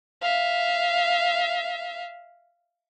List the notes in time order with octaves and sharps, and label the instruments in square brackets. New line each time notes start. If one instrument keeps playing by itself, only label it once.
[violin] E5 F5